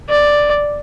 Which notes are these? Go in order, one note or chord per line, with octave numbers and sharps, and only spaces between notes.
D5